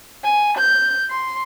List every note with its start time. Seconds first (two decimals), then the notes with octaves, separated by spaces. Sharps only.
0.24 G#5
0.57 G6
1.11 C6